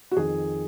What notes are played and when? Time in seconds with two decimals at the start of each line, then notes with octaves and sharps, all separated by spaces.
0.11 F#4
0.16 F2 D#3 G#4